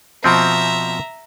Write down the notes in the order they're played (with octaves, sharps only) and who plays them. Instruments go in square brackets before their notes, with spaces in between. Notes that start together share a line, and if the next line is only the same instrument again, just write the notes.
[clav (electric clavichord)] B2 F3 C4 [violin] E5 A#5